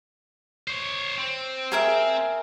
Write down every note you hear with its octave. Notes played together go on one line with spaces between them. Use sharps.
C5 C#5
C4
G#4 A#4 E5